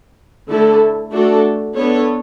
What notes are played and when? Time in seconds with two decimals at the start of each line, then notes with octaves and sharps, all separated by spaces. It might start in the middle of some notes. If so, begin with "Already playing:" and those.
0.49 D3 A3 E4 A4
1.11 A3 D4 F#4 A4
1.75 B3 D4 A4 C#5